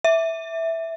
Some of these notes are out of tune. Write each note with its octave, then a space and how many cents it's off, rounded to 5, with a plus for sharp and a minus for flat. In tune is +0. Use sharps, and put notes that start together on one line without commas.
E5 -5